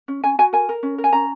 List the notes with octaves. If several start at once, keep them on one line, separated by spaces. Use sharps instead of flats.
C#4
C#4 G#5
F#4 G#5
A#4 G#5
A#4
C#4
A#4
G#5
C#4 A#5